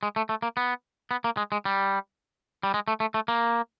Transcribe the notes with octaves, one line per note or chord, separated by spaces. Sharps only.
G#3
A3
A3
A#3
B3
B3
A#3
G#3
G#3
G3
G3
G#3
A3
A3
A3
A#3